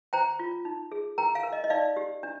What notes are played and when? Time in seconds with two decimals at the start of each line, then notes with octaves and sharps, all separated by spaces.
0.13 C5 G5 A#5
0.39 F4
0.65 D#4
0.92 G#4
1.18 A#4 G5 A#5
1.35 F5 G#5
1.43 A#4
1.53 D#5
1.64 D#5
1.70 D#4 D5 F5
1.97 G4
2.23 D4